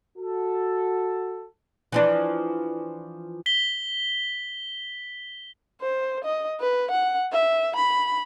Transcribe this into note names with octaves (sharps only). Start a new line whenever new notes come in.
F#4 A4
E3 F3 D4
B6 G7
C5
D#5
B4
F#5
E5
B5